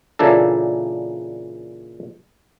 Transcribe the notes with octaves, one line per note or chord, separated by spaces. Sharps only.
A#2 C#3 E3 A#3 D4 A4